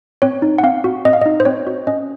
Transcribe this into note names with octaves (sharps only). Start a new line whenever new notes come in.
C4 C#5
D#4
F#5
C4 F5
F#4
C4 D#5
F5
D#4 D#5
C5
C4 C#5
F#4
C#4 D#5